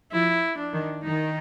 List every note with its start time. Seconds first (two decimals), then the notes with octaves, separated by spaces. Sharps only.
0.12 F3 E4
0.58 D4
0.73 D#3
1.04 D#3 D#4